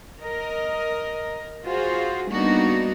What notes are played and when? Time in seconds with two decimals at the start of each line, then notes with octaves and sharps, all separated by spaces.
0.22 A#4 D#5
1.65 F4 F#4 G#4 C5
2.29 G3 A#3 B3 D4 D#4 F#4